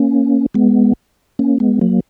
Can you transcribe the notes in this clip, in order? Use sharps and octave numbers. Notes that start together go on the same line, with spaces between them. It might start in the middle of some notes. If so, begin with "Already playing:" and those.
Already playing: A#3 C#4
G#3 B3
A#3 C#4
G#3 B3
F#3 A#3